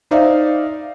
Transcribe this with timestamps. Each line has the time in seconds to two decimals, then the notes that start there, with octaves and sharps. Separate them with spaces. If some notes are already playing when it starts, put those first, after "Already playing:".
0.11 D#4 C5 D5 E5 F5